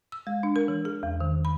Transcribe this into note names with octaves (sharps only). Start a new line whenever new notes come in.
E6
G#3
D4
A#4
E3
G#4
E2
D#3
B5